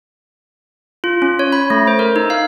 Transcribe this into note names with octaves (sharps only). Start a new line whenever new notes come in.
F4
C#4
C#5
B5
A3
C5
A#4
D#4
F5